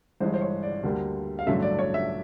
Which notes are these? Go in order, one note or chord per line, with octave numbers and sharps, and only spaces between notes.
G1 G2 E3 G#3 C5
C5
C#5
D5
D2 D3 G3 A#3
F5
A1 G2 D3 F#3 A3 E5
D5
C#5
E5